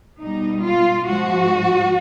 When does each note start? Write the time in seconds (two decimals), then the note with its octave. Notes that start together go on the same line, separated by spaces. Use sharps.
0.21 B2 G3 D#4
0.64 F4
1.07 G#2 F3 G#3 F#4